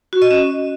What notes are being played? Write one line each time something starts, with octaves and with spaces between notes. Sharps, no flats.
F#4
D#5
C#4